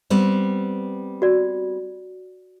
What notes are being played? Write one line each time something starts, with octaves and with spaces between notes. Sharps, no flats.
G3 B3 C4
F#4 D5